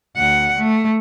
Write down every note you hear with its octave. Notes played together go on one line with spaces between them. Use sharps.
D2 F#5
A3